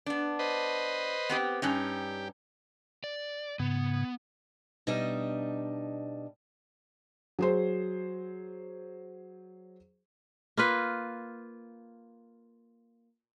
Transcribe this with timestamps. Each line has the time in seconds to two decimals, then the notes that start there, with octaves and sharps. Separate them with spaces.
0.06 B3 D4
0.39 B4 C5 D#5
1.30 B3 C4 G4
1.62 G2 C#4 D#4 G4
3.04 D5
3.59 G#2 C#3 B3
4.87 B2 G3 D4 D#4 D#5 E5
7.39 F#3 G#4 C5
10.57 A#3 F4 B4